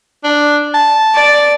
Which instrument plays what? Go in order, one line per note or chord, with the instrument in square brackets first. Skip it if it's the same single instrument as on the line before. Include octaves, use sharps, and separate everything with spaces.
[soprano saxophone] D4
A5
[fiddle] D5